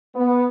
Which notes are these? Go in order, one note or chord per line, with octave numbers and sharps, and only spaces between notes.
B3